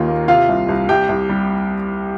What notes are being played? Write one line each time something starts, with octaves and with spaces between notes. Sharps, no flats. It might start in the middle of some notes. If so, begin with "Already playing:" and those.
Already playing: D#2 D#3 F4
A#3
C3 F4 F5
C2
C2
C2 G4 G5
C2
G3